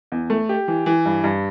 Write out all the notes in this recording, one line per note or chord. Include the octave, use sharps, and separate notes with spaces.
E2
A3
G4
E3
E3
G2
G2